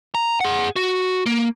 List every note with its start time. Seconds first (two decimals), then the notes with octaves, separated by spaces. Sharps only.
0.15 A#5
0.41 G#4 F#5
0.76 F#4
1.26 A#3